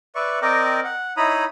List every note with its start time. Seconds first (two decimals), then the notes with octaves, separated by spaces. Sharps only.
0.15 B4 D5 E5 C#6
0.42 C4 A#4 D5 D#5 G5 D6
0.84 F#5
1.17 D#4 E4 C#5 A#5 B5 D#6